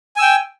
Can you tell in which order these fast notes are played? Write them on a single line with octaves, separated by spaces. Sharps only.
G#5 E6 G5